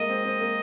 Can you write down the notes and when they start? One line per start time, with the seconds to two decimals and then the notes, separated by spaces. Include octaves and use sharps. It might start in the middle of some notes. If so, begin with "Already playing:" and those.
Already playing: G#3 A#3 D#5
0.09 C4
0.24 C4
0.40 A#3